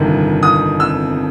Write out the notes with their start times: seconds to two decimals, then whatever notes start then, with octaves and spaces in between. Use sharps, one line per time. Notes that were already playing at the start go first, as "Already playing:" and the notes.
Already playing: G1 F2 C3 D#3
0.43 D#6
0.80 E6